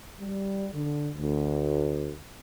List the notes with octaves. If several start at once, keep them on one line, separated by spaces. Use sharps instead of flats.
G3
D3
D2